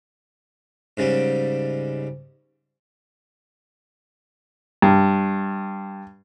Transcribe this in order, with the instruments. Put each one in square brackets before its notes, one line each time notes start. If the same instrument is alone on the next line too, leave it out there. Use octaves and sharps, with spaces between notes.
[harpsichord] G#2 C#3 G3
[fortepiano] G2